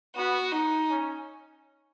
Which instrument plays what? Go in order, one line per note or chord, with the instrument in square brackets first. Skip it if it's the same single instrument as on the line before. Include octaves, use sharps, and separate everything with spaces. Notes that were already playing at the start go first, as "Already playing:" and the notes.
[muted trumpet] B3 [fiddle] F#4
[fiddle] D#4
[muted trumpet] C#4